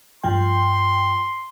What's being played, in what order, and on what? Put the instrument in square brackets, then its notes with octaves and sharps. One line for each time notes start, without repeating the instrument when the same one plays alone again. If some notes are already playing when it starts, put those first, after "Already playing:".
[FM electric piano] G2 F3 G5 [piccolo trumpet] C6